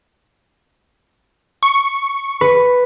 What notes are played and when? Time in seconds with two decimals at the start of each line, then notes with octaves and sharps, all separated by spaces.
1.63 C#6
2.41 B4